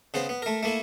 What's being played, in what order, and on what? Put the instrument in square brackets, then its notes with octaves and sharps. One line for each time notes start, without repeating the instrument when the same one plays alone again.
[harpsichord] C#3 B3 C5
B3
A3 A#4
A3 A#3 E4